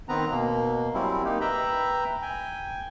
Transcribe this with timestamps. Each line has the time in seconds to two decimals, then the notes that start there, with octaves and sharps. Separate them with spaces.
0.09 D#3 B3 C4 B4 A#5
0.31 B2 A#3
0.94 F#3 G3 C4 C#4 E4
1.24 A#3 D#4 G4
1.41 B4 E5 G5 A#5 B5
2.22 G5 G#5